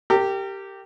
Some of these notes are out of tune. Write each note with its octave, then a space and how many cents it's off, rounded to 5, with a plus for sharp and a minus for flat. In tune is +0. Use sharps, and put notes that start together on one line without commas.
G4 -5 A#4 -35